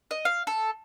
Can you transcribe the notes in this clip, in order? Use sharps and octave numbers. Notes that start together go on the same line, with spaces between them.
D#5
F5
A4